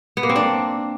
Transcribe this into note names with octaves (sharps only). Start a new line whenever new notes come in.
B3
A#3
C4
D4